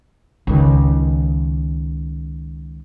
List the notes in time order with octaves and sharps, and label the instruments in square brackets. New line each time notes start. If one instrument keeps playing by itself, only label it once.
[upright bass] C#2 D#3